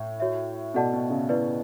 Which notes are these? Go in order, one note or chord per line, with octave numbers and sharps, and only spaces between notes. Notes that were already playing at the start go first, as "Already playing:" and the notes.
Already playing: A2
F#4 C#5 E5
B2 F#4 A4 D5 F#5 A5
B2
C#3
E4 B4 D5